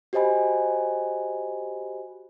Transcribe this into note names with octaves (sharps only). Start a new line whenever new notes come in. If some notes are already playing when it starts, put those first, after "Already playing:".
F#4 G4 C5 D#5 G#5 B5